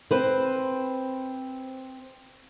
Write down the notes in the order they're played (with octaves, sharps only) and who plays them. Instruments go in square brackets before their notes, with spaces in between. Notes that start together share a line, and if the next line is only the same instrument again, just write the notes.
[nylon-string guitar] C4 B4 C5